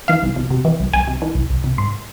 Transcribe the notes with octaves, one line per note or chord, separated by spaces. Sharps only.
E3 F5
C2
C2
C3
E3
C2
C2 G#5
C3
E3
C2
C2
C3
G#2 C6